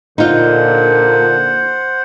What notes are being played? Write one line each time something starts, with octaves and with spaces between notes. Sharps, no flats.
A#2 D3 D#4 F4 C5 F#5